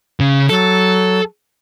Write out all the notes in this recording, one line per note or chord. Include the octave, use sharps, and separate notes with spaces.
C#3
F#3 A4